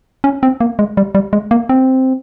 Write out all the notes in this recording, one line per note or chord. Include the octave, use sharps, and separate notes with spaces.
C#4
C4
A#3
G#3
G3
G3
G#3
A#3
C4